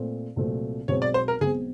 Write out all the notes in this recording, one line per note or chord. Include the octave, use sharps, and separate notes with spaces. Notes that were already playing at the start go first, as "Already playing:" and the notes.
Already playing: A#2 A3 C4
C2 A#2 F#3 A3 C4
B1 B2 G#3 C4 C#5
D5
C5
A#4
B1 B2 G#3 C4 G#4